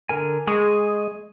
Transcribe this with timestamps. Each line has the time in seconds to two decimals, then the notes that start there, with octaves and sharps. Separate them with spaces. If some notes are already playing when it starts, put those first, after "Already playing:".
0.09 D3 A#4 G#5
0.47 G#3 G#4 G#5 C#6 D#6